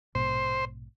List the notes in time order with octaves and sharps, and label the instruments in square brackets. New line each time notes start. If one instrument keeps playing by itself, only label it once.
[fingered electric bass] A#1 G#2 B2 [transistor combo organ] C5